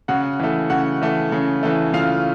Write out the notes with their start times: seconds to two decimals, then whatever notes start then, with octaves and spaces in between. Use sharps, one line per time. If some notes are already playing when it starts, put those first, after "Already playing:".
0.08 C#3 F#4 F#5
0.40 E3 A3
0.70 C#3 F#4 F#5
1.02 E3 A3
1.32 C#3
1.63 E3 A3
1.94 C#3 F4 F5